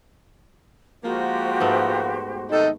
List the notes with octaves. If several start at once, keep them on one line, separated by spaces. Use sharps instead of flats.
F3 G#3 A#3 F#4 G4 C5
G#2 A3 B3
C3 D#3 D#4 A4